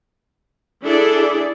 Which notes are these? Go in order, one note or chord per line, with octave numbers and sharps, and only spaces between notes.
D4 E4 G#4 A4 D5